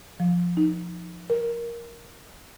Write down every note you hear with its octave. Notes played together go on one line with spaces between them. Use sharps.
F3
D#4
A#4